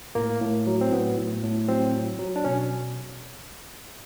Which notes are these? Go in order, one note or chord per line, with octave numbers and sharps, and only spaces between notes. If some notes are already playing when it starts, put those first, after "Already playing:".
A2 A#3
A2
F#3
C4
A2 B3
A2
A2
F#3 C4
F#3
F#3
D4
B2 C#4